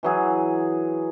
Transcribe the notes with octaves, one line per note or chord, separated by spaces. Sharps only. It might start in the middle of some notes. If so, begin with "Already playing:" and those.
E3 F#3 G#4